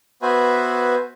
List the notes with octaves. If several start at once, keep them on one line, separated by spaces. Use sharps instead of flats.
B3 F#4 B4 C5 E5 G#5